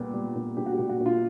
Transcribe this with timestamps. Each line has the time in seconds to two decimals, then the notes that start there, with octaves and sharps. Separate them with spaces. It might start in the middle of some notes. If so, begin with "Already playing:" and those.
Already playing: A#2 G3 B3
0.14 G3
0.35 A#2
0.57 A#2 G4
0.66 F#4
0.73 G4
0.79 A#2
0.89 F#4
1.00 A#2
1.06 F4